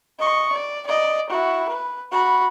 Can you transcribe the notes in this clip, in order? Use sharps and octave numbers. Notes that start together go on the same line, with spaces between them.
D#5 C#6
D5
D5 D#5
E4 F#4
B4
F#4 B5